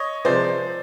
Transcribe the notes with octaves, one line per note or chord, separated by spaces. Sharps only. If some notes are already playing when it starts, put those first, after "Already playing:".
Already playing: C#5 D#5
C3 F3 G#3 C5 D5